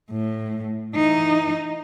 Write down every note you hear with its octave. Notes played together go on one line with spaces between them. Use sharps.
A2
E3 D#4